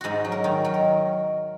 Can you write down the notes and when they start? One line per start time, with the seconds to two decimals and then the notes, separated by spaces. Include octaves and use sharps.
0.01 G#2 F#4 G#4
0.25 F#3
0.32 A#4
0.44 D#3
0.65 F#3
0.74 A#4